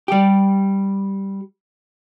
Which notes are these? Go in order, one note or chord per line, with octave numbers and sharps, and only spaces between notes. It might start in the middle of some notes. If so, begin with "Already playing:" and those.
G3 G4